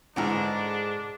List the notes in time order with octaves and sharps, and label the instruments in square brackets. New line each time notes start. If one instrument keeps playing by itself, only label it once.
[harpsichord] G#2 [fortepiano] D3 E3 G#3 [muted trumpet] D4 [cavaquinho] F#4 A4 A#4